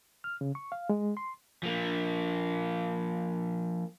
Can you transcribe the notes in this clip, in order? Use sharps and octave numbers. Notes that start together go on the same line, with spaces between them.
F6
C#3
C#6
F5
G#3
C6
F3 A#3